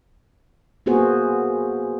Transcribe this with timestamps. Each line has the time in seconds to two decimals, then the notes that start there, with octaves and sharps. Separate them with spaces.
0.86 A#3 B3 F#4 G#4 C5